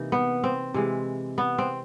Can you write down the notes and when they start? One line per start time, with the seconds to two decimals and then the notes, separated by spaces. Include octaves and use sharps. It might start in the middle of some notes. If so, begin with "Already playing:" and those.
Already playing: C3 E3 A#3 D#4
0.12 B3
0.44 C4
0.74 C3 E3 G#3
1.38 B3
1.58 C4